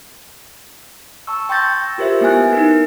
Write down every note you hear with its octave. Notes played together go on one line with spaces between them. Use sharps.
A5 C#6 E6
G5 C6 C#6 G6 A6 A#6
E6
F4 G4 A#4 C5 E5
A#3 B3 E4 G#5 F#6
D#4 E4 A#4